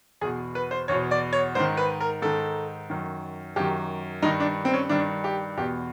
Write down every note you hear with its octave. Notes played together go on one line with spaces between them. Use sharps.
E2 B2 G#4
B4
C5
E2 B2 C#5
D5
C#5
G#2 D#3 C5
B4
A#4
G#2 D#3 A4
F#2 D#3
F#2 D#3 G4
G2 D#3 D#4
D4
C4
C#4
G2 D#3 D4
G4
E2 B2 G4